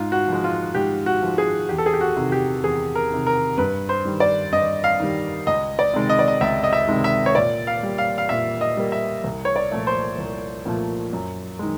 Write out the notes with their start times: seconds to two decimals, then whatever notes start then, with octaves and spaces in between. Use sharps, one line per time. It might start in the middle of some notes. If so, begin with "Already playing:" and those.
Already playing: G#2 F4
0.12 F#4
0.28 F3 G#3
0.44 F4
0.75 G#2 G4
1.06 F#4
1.22 F3 G#3
1.38 G#4
1.69 E2 G4
1.78 A4
1.86 G#4
1.94 G4
2.01 F#4
2.16 C3 D#3
2.32 G4
2.63 E2 G#4
2.95 A#4
3.12 C3 D#3
3.27 A#4
3.57 G2 B4
3.89 C5
4.05 D#3 G3
4.20 D5
4.53 G2 D#5
4.84 F5
5.00 D#3 G3
5.47 C#2 D#5
5.79 D5
5.93 C3 D#3 G#3
6.10 D#5
6.19 D5
6.28 D#5
6.41 C#2 E5
6.64 D#5
6.73 E5
6.88 C3 D#3 G#3
7.04 E5
7.26 C#5
7.35 A#2 D5
7.67 F5
7.83 G3 A#3
7.98 F5
8.18 F5
8.29 A#2 E5
8.61 D#5
8.77 G3 A#3
8.92 E5
9.24 C2
9.45 C#5
9.56 D5
9.72 A#2 F3 A3
9.87 C5
10.18 C2
10.66 A#2 F3 A3
11.13 F#2
11.59 D#3 G#3